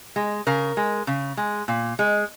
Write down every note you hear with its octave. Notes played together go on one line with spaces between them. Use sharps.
G#3
C#3 A#4
G#3
C#3
G#3
A#2
G#3